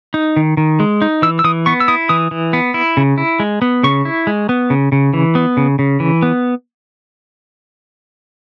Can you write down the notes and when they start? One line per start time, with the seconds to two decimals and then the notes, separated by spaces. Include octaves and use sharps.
0.14 D#4
0.37 D#3
0.57 D#3
0.80 G#3
1.02 D#4
1.22 E3 E6
1.39 E6
1.44 E3 D#6
1.66 B3 C#6
1.80 E6
1.88 E4 D#6
2.09 E3 D#6
2.31 E3
2.53 B3
2.74 E4
2.97 C#3
3.18 E4
3.40 G#3
3.62 B3
3.84 C#3 C#6
4.05 E4
4.27 G#3
4.49 B3
4.70 C#3
4.92 C#3
5.14 E3
5.35 B3
5.57 C#3
5.79 C#3
6.00 E3
6.22 B3